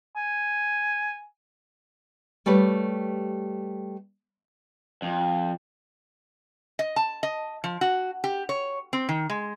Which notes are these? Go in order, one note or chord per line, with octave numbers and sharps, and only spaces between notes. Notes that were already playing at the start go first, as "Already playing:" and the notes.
G#5
G3 A3 G4 B4 C#5
F2
D#5
A5
D#5
F3
F#4
G4
C#5
C4
D#3
G#3